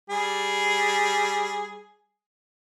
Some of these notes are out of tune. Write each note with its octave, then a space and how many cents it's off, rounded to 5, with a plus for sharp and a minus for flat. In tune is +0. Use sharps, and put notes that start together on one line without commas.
G3 +0 G#4 +0